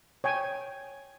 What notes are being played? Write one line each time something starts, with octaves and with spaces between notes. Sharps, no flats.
C#5 G5 G#5